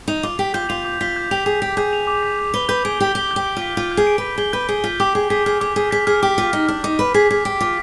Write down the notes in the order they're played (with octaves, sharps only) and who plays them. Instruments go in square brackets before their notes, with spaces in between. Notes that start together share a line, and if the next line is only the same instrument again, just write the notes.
[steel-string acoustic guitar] D#4 [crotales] F7
[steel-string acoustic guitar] F4 [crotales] D6
[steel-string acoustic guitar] G4 [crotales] B6
[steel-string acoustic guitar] F4 [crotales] G6
[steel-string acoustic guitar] F4 [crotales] F7
[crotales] D6
[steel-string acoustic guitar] F4 [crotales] B6
[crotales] G6
[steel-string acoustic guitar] G4 [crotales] F7
[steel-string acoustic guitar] G#4 [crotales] D6
[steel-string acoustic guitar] G4 [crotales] B6
[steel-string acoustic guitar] G#4 [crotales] G6
[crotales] F7
D6
B6
G6
[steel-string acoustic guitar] B4 [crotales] G7
[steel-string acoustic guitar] B4 [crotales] G6
[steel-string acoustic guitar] G#4 [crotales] D7
[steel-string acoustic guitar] G4 [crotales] B6
[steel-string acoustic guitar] G4 [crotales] G7
[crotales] G6
[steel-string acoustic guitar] G4
[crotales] D7
[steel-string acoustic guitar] F4
[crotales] B6
[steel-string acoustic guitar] F4 [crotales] G7
[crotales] G6
[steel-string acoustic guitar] G#4
[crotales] D7
[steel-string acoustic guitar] B4 [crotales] B6
[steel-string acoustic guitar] G#4 [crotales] G7
[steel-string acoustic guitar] B4 [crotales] G6
[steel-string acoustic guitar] G#4 [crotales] D7
[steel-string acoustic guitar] F4 [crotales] B6
[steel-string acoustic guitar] G4 [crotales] D6
[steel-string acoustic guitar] G#4 [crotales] D6
[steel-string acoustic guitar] G#4 [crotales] B6
[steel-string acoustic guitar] G#4 [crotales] F6
[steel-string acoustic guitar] G#4 [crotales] D6
[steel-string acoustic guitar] G#4 [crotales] D6
[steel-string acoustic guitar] G#4 [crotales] B6
[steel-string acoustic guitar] G#4 [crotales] F6
[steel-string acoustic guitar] G4 [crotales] D6
[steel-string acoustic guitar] F4 [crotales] D6
[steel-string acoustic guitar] D#4 [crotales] B6
[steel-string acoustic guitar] D4 [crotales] F6
[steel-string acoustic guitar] D#4 [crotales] D6
[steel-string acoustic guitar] B4 [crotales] D6
[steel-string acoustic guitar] G#4 [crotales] B6
[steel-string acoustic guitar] G#4 [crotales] F6
[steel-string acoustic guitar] G4 [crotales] D7
[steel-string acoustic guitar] F4 [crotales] D6